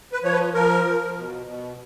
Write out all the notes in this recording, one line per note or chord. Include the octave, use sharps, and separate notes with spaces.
B4
F3 C#5
B4
F3 A#4
F3
B2
B2